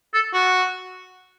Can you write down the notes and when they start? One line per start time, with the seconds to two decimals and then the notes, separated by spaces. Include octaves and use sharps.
0.14 A4
0.34 F#4